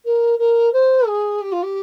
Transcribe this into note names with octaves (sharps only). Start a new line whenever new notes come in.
A#4
A#4
C5
G#4
G4
F4
G4